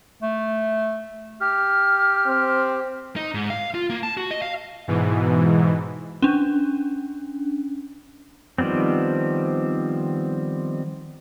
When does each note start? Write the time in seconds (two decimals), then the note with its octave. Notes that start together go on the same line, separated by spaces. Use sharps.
0.22 A3
1.41 G4 F6
2.27 C4
3.16 D#4
3.34 G#2
3.50 F5
3.75 F4
3.90 A#3
4.03 A5
4.17 F#4
4.31 D#5
4.42 F5
4.88 G#2 B2 E3
6.22 C#4 D4
8.58 D#3 F3 G3 B3 C4